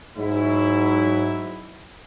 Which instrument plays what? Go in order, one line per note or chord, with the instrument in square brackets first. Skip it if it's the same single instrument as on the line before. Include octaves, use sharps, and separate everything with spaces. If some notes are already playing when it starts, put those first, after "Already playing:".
[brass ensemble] G#2 F#3 E4